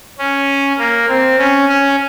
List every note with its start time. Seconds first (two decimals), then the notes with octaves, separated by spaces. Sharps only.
0.19 C#4
0.79 A#3
1.09 C4
1.39 C#4
1.69 C#4